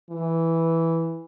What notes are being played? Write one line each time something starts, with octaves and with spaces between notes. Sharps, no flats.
E3